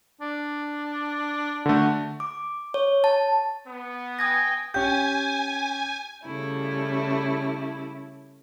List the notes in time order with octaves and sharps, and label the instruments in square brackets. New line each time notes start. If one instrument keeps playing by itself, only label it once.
[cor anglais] D4
[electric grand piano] D3 A3 [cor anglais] F#4
[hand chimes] D6
C#5
A5
[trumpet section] B3
[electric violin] G5 G#5 [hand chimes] D#6 G#6 A#6
[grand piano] C#4 G4 [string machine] G#5 [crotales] G6
[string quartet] C#3 G3 A3 E4